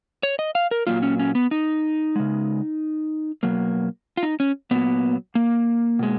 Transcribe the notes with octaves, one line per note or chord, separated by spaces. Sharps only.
C#5
D#5
F5
A#4
A#2 F#3 A#3 F4
C#4
C#4
B3
D#4
C#3 G#3
B2 F#3 A#3
F4
D#4
C#4
A#2 F#3 A#3 B3
A#3
B2 G#3